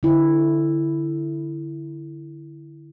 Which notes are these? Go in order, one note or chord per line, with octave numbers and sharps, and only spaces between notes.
D3 E4